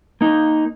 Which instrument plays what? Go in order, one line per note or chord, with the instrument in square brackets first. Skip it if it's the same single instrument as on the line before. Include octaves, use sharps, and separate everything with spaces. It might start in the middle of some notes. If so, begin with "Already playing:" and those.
[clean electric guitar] A#3 D#4